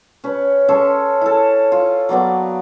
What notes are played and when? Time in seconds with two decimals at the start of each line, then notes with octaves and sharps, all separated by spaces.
0.24 C#4 B4
0.69 C#4 A4 E5 C6
1.21 E4 A4
1.72 F4
2.09 F#3 A#3 B3 D5